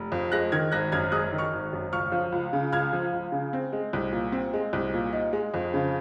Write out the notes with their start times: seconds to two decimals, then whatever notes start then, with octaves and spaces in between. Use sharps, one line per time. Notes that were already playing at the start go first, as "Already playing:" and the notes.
Already playing: F1
0.12 F2
0.32 G#3 F#6 A#6
0.52 D#3 F6 G#6
0.72 G#1 F#6 A#6
0.92 F#2 F6 G#6
1.12 G#3 D#6 F#6
1.33 D#3
1.38 C#6 F6
1.53 G#1
1.73 F#2
1.92 C#2 C#6 F6
2.12 F3
2.32 C#2
2.53 C#3
2.73 C#2 F6 G#6
2.93 F3
3.12 C#2
3.32 C#3
3.53 C4
3.73 G#3
3.93 C2
4.12 A#2
4.32 C4
4.53 G#3
4.73 C2
4.94 A#2
5.13 D#4
5.33 G#3
5.54 F2
5.74 C#3